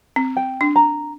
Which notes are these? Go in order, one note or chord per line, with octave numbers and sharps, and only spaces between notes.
C4
G5
D4
A#5